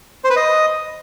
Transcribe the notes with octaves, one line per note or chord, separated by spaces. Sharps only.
C5
B4
D#5